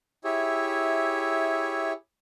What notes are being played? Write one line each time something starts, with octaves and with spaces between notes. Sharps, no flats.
E4 G4 G#4 C#5 E5